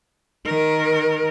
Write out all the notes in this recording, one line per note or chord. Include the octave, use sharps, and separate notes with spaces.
D#3 A#4